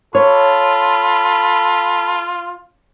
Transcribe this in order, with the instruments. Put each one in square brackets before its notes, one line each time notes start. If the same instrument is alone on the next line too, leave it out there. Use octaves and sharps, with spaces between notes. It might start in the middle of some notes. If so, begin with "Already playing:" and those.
[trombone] F4 [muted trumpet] A4 [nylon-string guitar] C#5 [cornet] B5